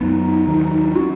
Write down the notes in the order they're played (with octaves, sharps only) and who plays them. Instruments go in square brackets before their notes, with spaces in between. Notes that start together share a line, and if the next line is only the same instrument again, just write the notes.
[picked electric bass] F#2 F#3 B3 [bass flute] D#4
[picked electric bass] D#2 D#3 F#3
[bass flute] D#4
[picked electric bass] F#3 C#4 [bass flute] F#4